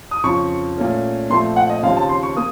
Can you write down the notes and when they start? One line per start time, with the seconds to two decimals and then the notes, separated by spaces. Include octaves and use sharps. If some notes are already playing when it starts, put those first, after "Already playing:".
0.11 D#6
0.24 F2 C#3 F3 C#6
0.77 A#2 A3 C#4
1.30 A#2 F3 A3 C4 C6
1.56 F#5
1.70 D#5
1.83 D#2 C#3 F3 C4 F5
1.96 A5
2.09 C6
2.23 C#6
2.36 A#3 D#6